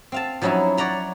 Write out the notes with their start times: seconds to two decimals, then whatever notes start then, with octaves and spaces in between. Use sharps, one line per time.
0.12 C4 F5 A5
0.42 F3 F#3 C#4 D#4 E4
0.77 C#5 D5 F#5 A#5 B5